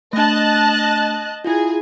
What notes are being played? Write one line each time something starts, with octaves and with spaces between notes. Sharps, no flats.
A3 D4 D#5 A5 F#6
E4 F4 G#4